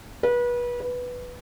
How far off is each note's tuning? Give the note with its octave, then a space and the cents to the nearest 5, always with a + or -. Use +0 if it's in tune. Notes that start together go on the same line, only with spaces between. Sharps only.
B4 -30
B4 +0